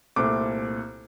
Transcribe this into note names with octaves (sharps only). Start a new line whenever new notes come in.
C2 A#2 A3 C4 D6